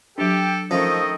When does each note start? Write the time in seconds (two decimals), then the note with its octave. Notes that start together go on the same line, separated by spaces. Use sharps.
0.18 F#3 D4 G4 A4
0.71 D#3 F3 A3 C#4 D#5